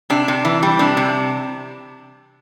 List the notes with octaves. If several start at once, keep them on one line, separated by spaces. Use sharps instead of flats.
C3 D4
C3
E3
G3
C3 D4
C3